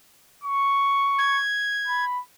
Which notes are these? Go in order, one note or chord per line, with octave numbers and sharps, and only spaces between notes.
C#6
G#6
B5